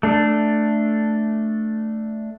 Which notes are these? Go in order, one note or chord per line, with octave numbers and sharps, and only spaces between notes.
A3 D4